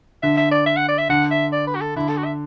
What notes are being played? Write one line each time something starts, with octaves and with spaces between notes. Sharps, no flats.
D3 E5
E5
D5
E5
F#5
D5
E5
D3 F#5
E5
D5
B4
F#4
A4
D3 E4
A4
F#4
E5